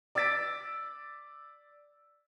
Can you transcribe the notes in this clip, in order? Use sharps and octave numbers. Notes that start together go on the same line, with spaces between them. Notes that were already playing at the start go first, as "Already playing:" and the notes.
D5 D6 E6 A6 B6 D7